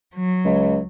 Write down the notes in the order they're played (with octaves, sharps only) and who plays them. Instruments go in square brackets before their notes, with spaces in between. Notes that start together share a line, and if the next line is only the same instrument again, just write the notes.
[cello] F#3
[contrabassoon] C#2